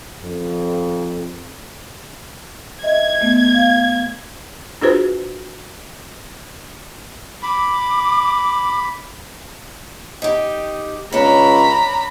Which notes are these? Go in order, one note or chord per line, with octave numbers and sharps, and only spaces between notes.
F2
D#5 E5 G#6
A3 B3
F5
D4 F4 F#4 G#4 B4 C5
B5 D6
D#4 G4
C#2 C#4 D4 A#5 B5